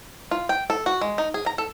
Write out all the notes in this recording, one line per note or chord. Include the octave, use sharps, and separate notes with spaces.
F4
G5
A4
F#4
G#3
D#4
G#4
A#5
A4